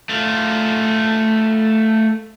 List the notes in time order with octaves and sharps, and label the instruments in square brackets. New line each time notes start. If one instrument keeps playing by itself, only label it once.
[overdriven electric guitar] A3 F4